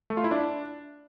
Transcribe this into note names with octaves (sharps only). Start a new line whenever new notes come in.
A3
F4
E4
D4